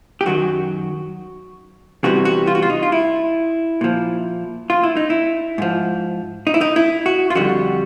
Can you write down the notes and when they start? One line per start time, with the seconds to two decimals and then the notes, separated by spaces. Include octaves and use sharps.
0.21 G4
0.26 F#2 D#3 F#3 F#4
2.03 E2 C3 E3 G3 F#4
2.25 F#4
2.47 F4
2.55 F#4
2.62 F4
2.70 D#4
2.83 F4
2.92 E4
3.81 A#2 F3
4.70 F4
4.83 E4
4.97 D#4
5.10 E4
5.58 G#2 F3
6.47 D#4
6.54 E4
6.61 D#4
6.76 E4
7.06 F#4
7.30 F4
7.35 F2 D3 G3 F#4